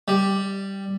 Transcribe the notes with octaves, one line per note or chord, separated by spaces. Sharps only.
G3